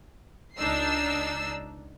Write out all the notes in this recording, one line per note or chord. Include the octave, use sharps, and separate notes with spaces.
C#2 D4 D#4 E6 C7